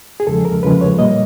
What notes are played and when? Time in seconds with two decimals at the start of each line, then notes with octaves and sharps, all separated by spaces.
0.20 G#4
0.27 E2 C#3 F3 G#3 A4
0.45 A#4
0.63 E2 C#3 F3 G#3 B4
0.81 C#5
0.98 A#2 G3 A#3 D#5